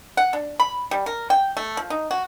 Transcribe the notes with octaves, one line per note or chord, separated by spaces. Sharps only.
F#5
D4
B5
G3
A#4
G5
A3
F3
D#4
F#4